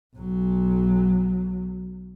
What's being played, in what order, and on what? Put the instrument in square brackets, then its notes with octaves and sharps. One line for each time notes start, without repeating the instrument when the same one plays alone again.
[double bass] B1 F#3